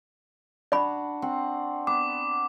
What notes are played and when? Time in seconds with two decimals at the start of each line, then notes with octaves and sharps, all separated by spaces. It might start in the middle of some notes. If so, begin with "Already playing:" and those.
0.72 D4 F#4 D5 B5
1.22 C4 F#5
1.87 B3 D6